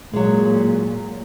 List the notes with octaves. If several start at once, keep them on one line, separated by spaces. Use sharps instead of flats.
A#2 F#3 G#3